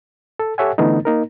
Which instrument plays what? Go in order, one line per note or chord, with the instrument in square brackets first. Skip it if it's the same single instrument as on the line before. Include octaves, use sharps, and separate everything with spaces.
[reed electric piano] A4
G4 A4 C#5 E5 F#5 G#5
D3 E3 A3 B3 D#4
A#3 D#4 A#4